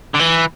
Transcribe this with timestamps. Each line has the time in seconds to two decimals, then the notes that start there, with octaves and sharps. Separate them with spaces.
0.14 D3
0.19 E3